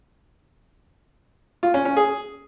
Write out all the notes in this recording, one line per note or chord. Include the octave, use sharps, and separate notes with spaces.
F4
C#4
C#4
G#4